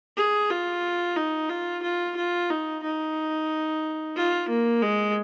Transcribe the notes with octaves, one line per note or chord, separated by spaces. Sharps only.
G#4
F4
D#4
F4
F4
F4
D#4
D#4
F4
A#3
G#3